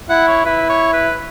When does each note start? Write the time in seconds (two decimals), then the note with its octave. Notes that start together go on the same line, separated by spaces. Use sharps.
0.10 E4 F#5
0.28 C#5
0.45 E4 B4
0.69 C#5
0.93 B4